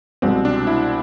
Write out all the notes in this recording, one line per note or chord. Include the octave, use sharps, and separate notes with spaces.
C2 B2 G#3 C4
D4
E4